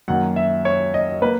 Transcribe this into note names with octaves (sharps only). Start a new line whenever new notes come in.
F#2 D#3 A#3 F#5
E5
C#5
D#5
A#3 B4